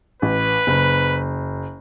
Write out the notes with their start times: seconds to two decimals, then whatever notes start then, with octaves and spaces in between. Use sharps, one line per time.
0.22 A1 B4
0.67 F#1